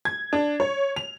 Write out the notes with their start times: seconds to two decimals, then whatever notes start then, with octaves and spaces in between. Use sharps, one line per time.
0.05 G#6
0.33 D4
0.60 C#5
0.96 F7